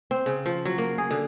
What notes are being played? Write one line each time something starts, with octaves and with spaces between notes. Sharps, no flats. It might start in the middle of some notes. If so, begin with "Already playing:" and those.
C4
C#3
F3
F#3
A#3
G#4
D3